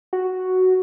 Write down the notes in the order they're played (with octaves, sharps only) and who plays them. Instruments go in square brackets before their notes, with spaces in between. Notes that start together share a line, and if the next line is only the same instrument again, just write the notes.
[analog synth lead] F#4